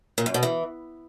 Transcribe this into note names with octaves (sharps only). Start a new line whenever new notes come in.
A#2
F#2
B2
E3